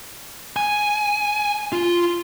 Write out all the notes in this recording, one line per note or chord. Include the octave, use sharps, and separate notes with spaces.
G#5
F4